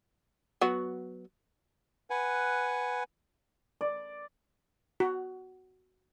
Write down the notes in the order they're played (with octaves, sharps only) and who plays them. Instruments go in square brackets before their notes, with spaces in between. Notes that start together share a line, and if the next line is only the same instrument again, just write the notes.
[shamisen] F#3 B3 F#4
[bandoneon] B4 F#5 G#5
[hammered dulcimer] D5
[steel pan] F#4